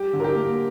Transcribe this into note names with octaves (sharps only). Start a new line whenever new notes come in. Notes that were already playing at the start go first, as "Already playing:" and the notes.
Already playing: G3 G4
D3
A#4
G4
A#3